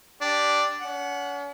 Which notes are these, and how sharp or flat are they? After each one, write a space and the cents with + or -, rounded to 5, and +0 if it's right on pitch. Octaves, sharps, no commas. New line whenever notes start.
D4 +0 G4 +0
C#4 +45 F#5 +0